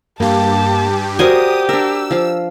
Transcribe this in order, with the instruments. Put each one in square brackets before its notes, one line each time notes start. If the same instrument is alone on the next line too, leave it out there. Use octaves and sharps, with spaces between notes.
[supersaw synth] G2 G4 [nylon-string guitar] A#3 [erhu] A5
[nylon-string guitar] F#4 D5 [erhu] G4 [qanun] A#4 C5 G#5 [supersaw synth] D#6
[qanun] D4 A#4 [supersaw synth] E6
[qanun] F3 F5